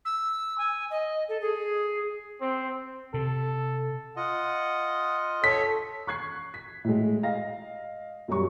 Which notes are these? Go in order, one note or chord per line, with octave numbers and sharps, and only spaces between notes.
E6
G#5
D#5
A4
G#4
C4
C3 A4
F4 D#5 F#5
A4 C#5 B6
C#6 F#6 G#6 C7
B6
A2 G#3
D#5 F5 A#6
F#2 F#3 G3 C#6